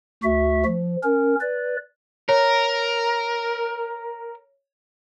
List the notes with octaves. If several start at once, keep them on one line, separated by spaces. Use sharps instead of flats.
D2 F#4 E5
F3
C#4 A#4
B4 D5
A#4 C#5